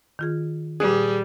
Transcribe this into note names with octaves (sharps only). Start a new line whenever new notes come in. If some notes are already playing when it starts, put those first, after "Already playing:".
D#3 F4 G#4
A#2 G3 G#4 B4 F#6